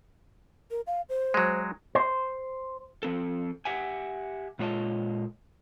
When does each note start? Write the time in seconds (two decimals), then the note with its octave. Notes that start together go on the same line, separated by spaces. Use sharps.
0.71 A#4
0.87 F5
1.09 C5
1.34 F#3 G#3
1.95 C5
3.03 F3 C4 A4
3.65 G4 E5 F#5 G#5
4.59 A#2 G#3 F4 C#5 D#5 A5